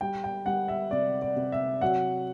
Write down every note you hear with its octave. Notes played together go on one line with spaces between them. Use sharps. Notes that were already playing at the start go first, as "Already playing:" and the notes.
G3 G5
G5
G3 F#5
E5
C3 D5
D5
C3
E5
F#3 F#5